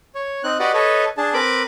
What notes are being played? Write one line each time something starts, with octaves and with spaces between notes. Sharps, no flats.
C#5
C4 D#4 F#6
F#4 G4 B4 D5 D#5 F#5
A4 B4 C#5 D#5
D4 G#4 A5
C4 A#4 B4 B5 D6